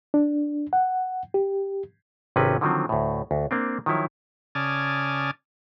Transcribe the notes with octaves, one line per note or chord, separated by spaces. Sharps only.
D4
F#5
G4
G#1 C3 C4 C#4 B4
D3 D#3 F3 F#3 C4
D2 A2
D2
A#3 C4 D4
D#3 F3 F#3 E4 C#5
C#3 D5 G#5 A5 D#6 F6